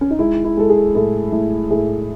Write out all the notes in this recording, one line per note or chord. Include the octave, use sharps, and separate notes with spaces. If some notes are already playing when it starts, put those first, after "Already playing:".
C#4
D#4
G#3 E4
E4
G#3 A4
G#4
A2 A4
A2
A2 G#4